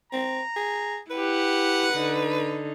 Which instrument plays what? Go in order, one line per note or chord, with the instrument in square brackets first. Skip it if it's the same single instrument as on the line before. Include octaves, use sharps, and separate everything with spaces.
[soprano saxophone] C4 [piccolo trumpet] A#5
[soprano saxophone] G#4
[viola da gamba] E4 G4 [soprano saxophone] B4 [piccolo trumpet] F#5
[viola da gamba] D3 D#4